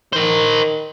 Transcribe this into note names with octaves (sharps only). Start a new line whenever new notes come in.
D#3 A#4 C5